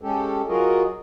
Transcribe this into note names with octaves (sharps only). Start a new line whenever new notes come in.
G#3 C#4 G4 A4
F#3 F4 F#4 G#4 A#4 D#5